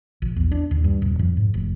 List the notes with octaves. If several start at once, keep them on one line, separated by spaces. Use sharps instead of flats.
A#1
E2
D4
D#2
G2
D#1
F2
G#2
F1